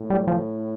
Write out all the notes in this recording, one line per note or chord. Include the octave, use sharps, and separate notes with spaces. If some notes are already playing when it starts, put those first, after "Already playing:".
Already playing: A2
G3
F3